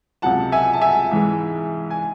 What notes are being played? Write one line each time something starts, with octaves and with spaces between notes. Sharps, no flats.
C#2 C3 F#3 F#5 A5
E5 G#5
A5
E5 G#5
G#2 E3 G#3
G#5